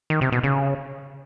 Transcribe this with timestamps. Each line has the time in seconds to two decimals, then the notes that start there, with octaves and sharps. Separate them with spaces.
0.10 D#3
0.21 C3
0.32 B2
0.43 C#3